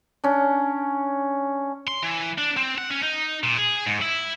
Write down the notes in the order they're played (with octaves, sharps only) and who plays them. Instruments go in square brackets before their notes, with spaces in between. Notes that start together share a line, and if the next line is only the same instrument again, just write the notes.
[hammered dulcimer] C#4 D4
[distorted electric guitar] C6
E3
D4
C4
F#5
C#4
D#4
A#2
G#4
G#2
E4